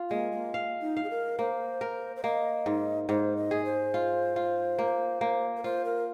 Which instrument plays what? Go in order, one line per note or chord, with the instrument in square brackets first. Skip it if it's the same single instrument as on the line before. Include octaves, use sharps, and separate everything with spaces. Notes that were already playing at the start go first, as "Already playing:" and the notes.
Already playing: [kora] F4
[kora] G#3 [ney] A#3
[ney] A#3
[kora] F5
[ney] D#4
[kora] F5
[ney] G#4
A#4
[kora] A#3 [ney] C5
[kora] A#4
[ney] C5
[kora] A#3 [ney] D#5
[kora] G#2
[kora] G#2 [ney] C5
[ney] D#5
[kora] G#4
[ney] C5
[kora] F4
F4
A#3
A#3
[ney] A#4
[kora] F4 [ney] C5
[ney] A#4